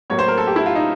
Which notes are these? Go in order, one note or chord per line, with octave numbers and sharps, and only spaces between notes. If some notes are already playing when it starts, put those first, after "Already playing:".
A2 F#3 A#3 C#5
C5
A#4
A4
G4
E4
F4
D#4